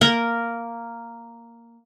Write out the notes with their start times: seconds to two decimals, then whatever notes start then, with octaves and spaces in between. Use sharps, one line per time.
0.01 A#3 A#4